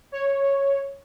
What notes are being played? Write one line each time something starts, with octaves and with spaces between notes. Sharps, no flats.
C#5